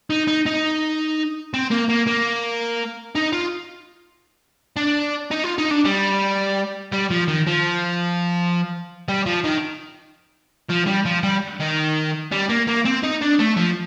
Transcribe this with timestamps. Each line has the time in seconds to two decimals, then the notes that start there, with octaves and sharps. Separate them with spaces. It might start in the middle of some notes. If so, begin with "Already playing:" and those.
0.10 D#4
0.27 D#4
0.46 D#4
1.54 C4
1.71 A#3
1.89 A#3
2.07 A#3
3.15 D#4
3.33 F4
4.76 D4
5.31 D#4
5.44 F4
5.58 D#4
5.71 D4
5.85 G3
6.92 G3
7.10 F3
7.28 D#3
7.47 F3
9.08 G3
9.26 F3
9.44 D#3
10.70 F3
10.87 G3
11.06 F3
11.23 G3
11.60 D#3
12.32 G3
12.49 A#3
12.67 A#3
12.85 C4
13.03 D#4
13.21 D4
13.39 A3
13.57 F3